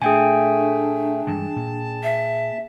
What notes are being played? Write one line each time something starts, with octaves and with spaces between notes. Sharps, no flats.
A#2 A3 D4 G#4 G5 G#5
G2 E3 G#3 A5
A#2
E5